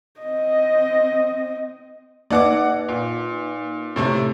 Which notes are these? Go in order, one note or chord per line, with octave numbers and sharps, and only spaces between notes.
C4 D#5
A#3 D#4 B4 D5 F#5 D6
A#2
A2 C3 A3